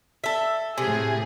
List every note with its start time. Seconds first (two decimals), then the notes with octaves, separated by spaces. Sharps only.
0.24 A4 E5
0.78 A2 C3 G#4